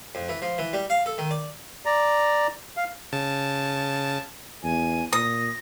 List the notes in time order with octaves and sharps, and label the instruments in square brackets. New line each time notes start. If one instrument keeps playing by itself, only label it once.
[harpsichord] F2
E3
F3
E3
G3
F5
A4
D#3
D5
[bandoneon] D5 A#5
F5
[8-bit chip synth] C#3 A5
[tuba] E2 [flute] G#5
[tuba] A#2 [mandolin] D#6 [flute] A#6